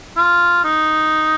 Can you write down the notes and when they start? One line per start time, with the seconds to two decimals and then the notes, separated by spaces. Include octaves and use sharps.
0.17 F4
0.64 D#4